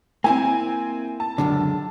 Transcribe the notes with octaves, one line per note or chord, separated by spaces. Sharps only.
A#3 C4 E4 G#5
A5
C#2 F#2 D3